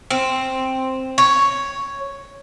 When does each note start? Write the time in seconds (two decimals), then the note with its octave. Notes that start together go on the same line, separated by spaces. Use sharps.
0.10 C4
1.18 C#5